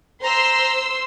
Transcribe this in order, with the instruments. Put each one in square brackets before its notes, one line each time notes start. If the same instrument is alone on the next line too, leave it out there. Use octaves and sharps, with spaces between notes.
[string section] C5 C6 E6 [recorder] A#5